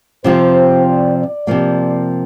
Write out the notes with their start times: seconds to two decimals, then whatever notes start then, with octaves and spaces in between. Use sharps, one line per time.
0.24 C3 F3 C4 F4 C5
0.86 D5
1.17 D5
1.47 C3 F3 A#3